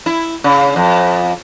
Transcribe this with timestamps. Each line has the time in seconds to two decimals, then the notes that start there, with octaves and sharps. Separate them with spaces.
0.06 E4
0.44 C#3
0.76 F2